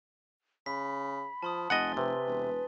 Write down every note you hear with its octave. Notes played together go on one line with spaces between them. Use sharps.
C#3 B5 B6
F3 A5 C6 D#6
F1 D#5 F#5 G#5 A6 G7
C3 B4
E1